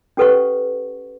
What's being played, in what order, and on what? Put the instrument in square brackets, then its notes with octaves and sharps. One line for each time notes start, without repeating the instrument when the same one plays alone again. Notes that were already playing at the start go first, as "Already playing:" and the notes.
[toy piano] C#4 G4 A4 B4 F#5 C#6